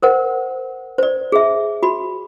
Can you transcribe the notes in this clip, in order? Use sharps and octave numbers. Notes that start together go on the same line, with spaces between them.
A#4 C5 F#5
C5 D5
G#4 E5
F#4 B5